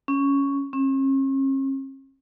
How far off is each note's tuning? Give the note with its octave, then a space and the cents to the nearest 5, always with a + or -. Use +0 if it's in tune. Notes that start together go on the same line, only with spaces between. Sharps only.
C#4 +5
C#4 -45